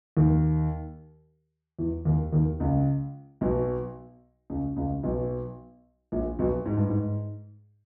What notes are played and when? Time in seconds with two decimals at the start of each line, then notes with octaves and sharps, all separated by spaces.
0.17 D#2 D#3
1.79 E2 E3
2.05 D#2 D#3
2.32 D#2 D#3
2.60 C#2 C#3
3.41 B1 B2
4.50 C#2 C#3
4.76 C#2 C#3
5.03 B1 B2
6.12 A#1 A#2
6.39 B1 B2
6.66 G#2
6.77 G2
6.88 G#2